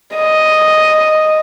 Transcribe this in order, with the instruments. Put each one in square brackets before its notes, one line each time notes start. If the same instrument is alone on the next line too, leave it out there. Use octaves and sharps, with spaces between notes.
[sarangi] D#5